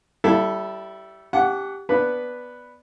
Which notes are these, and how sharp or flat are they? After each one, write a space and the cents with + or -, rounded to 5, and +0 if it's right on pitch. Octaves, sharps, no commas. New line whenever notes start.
G3 -20 E4 +5 A4 +0
C#4 +45 G4 +0 F#5 +0
B3 +0 D4 +0 B4 +0